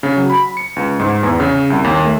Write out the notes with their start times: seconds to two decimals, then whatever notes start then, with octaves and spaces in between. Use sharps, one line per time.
0.03 C#3
0.16 F#3
0.30 B5
0.57 C#7
0.76 C#2
1.00 G#2
1.23 E2
1.40 C#3
1.70 C2
1.84 D#2
2.04 A3